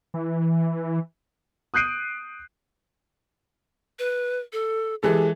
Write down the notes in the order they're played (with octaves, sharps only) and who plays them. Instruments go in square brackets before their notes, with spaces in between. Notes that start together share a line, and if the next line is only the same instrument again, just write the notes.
[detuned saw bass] E3
[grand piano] D#6 F#6 G6 C7 D7 D#7
[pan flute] B4
A4
[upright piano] E3 G#3 A4 [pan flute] G4